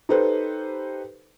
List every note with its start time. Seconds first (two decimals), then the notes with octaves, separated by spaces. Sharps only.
0.09 D#4 G4 A4 B4 C5